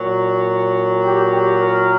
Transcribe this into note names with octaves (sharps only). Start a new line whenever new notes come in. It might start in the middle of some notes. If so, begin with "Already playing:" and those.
Already playing: A#2 F#3
G4
G4
A#4